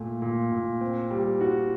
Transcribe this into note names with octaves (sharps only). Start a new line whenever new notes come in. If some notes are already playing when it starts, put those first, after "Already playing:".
Already playing: A#2 A3
A#2
A#2
C4
G3
F#4